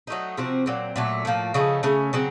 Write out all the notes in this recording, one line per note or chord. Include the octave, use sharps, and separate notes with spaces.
F#3 A3 D#4
C3 F3 C4 F#4
A#2 F#3 C4
A#2 F#3 A3
A2 F3 A#3
C#3 F3 A3 D#4
C#3 A3 C#4
C#3 F#3 C4